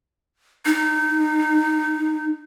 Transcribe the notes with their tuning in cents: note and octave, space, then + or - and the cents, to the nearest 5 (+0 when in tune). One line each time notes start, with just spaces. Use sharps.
D#4 -20